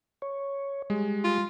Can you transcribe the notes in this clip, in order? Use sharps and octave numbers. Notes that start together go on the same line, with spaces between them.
C#5
G3 G#3
F4